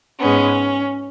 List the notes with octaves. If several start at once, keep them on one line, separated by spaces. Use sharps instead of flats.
G#2 G#3 B3 C#4